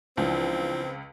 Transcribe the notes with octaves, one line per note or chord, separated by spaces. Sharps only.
C#2 E3 F3 C4 D4